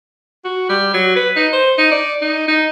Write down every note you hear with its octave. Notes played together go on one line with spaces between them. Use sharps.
F#4
G3
F#3
B4
D#4
C5
D#4
D5
D#4
D#4